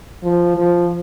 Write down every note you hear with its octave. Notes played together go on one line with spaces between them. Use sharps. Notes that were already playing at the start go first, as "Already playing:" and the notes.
F3
F3